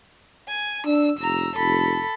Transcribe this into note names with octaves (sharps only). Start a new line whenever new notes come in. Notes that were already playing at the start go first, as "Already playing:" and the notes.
G#5
D4 E6
F1 A#5 E6
F1 A4 B5